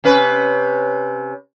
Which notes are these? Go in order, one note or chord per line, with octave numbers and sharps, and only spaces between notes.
C3 C#4 B4